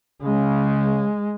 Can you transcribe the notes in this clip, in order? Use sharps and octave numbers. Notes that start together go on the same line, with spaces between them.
C#3 G#3